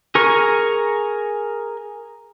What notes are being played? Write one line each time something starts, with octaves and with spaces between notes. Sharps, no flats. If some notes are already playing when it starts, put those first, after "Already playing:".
G#4 A#4 C#6